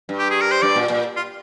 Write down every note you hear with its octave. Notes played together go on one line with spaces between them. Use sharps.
G2
G4
G#4
A#4
C5
G2 D5
A#2
A#2
F4